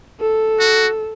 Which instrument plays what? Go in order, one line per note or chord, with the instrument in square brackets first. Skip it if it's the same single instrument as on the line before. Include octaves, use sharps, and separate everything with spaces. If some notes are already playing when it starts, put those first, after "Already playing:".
[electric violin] A4
[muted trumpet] F#4